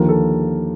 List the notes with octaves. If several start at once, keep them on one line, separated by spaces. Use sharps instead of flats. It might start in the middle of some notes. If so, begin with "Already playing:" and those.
Already playing: D#2 D3 F3 A#4
A4